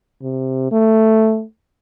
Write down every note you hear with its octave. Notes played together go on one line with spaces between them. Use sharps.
C3
A3